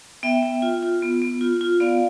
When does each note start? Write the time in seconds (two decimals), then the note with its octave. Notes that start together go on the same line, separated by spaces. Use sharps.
0.23 B3 E5 G5
0.43 B3
0.62 F4
0.83 F4
1.02 B3
1.22 B3
1.41 F4
1.61 F4
1.80 B3 D5 F5